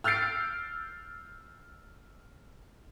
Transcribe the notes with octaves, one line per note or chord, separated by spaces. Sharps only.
E6 F6 G6 A6 C7 D7